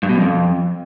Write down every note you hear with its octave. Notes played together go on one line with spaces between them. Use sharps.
G2
B2
F#2
F2